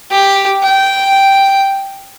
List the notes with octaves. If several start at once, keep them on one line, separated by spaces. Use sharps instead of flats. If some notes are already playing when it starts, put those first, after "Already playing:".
G4
G5